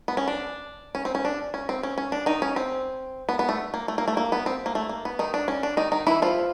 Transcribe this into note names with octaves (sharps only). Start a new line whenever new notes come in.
B3
C#4
D4
C#4
C4
C#4
D4
C#4
C4
C#4
C#4
D4
D#3 D#4
C#4
C4
B3
B3
A3
A#3
A3
A#3
A3
A#3
B3
C4
A#3
A3
A#3
B3
D#3 D#4
D4
C#4
D4
D#3 D#4
D#3 D#4
E3 E4
F3 F4